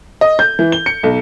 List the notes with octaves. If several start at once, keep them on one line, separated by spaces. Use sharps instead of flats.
D#5
G6
E3
G7
C#7
B1